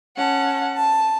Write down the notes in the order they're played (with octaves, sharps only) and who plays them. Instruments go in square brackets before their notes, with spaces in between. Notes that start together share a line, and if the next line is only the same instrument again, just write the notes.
[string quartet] C#4 F#5 A5
A5